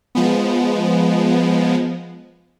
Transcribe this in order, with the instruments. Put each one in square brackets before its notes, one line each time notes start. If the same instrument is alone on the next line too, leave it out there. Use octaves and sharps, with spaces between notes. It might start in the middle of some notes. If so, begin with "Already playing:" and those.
[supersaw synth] F3 G#3 B3